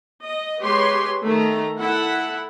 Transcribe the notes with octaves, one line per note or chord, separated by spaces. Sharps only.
D#5
G#3 G4 B4 C#5 C6
D#3 A3 A#5
E4 A4 F#5